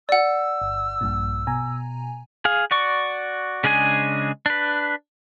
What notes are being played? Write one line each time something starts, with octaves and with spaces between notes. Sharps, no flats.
D5 F#5 E6
G1
A#1 G2 A#2
B2 G#5 A#5
G#4 F5
F#4 D5 C#6
C#3 G#3 D4 G#4 G#5
D4 B4